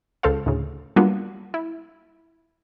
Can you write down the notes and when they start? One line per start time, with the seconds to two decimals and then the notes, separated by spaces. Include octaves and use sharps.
0.23 C#2 A4 C5 F5
0.46 D2 A2 C#3
0.96 F#3 G3 A#3 B3 D4 F4
1.54 E4